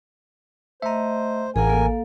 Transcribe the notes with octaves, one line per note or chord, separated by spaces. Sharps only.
A3 C5 D#5 E5 A#5
A1 G#4 A#4 F5 F#5 G#5
A#3 A4 F5